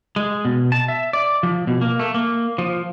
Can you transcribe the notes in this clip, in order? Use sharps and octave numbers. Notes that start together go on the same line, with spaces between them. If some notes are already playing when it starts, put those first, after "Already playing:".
G#3
B2
A5
E5
D5
F3
B2
A#3
A3
A#3
F3